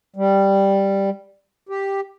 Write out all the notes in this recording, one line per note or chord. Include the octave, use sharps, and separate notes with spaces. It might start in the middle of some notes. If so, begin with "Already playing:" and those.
G3
G4